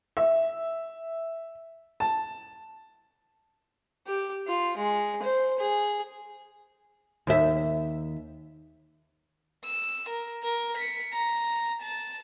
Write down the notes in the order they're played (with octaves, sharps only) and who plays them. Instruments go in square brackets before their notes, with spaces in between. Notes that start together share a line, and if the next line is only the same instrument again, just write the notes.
[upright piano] E5
A5
[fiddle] G4
F4
G#3
C5
G#4
[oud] D#2 E5
[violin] E6
A#4
A#4
B6 C#7
A#5
A5